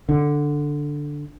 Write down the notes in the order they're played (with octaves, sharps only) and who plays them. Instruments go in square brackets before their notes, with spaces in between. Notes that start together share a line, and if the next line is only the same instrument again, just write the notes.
[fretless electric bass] D3